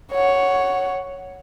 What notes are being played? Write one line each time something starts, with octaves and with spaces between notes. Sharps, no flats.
C#5 F#5